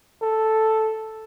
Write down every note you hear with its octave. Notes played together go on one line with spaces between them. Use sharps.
A4